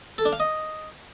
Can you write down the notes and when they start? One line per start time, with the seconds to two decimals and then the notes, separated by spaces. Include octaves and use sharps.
0.18 A4
0.25 D4
0.33 F5
0.40 D#5